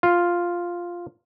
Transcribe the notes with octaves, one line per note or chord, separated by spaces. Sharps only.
F4